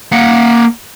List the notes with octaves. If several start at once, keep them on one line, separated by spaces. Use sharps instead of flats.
A#3 F#5